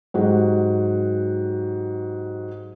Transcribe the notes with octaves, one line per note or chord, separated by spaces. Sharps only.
G#2 F#3 F#4 G4